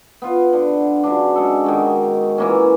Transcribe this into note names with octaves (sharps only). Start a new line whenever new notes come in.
B3 F4
D3
C#3 F#3 D4
G#3 A4
D#3 G#3 F#4
E3 A#3 C#4